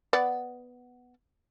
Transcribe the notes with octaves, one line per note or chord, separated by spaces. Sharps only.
B3 D5 F#5